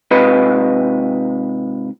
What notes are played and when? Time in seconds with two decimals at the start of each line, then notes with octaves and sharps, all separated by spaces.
0.11 G#2 C3 F4 B4 D#5 B5